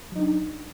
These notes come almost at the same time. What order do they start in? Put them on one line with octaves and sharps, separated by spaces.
F#3 D#4 D4